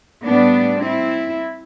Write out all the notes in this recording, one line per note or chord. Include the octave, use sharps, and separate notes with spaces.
A2 G3 B3 D4
C4 E4